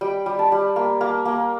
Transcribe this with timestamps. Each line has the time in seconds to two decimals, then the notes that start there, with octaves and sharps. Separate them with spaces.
0.01 G3 G5
0.26 G3
0.39 A5
0.52 G3
0.76 A#3
1.01 A#3
1.25 A#3